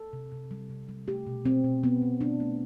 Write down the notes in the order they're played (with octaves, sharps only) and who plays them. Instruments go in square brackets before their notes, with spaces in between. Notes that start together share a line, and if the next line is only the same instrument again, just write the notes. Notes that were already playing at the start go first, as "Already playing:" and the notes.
Already playing: [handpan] A4
C3
C3
G3
C3
G3
A3 G4
B2
B2 C4
B2
B2 B3
B2
A3 D4
A3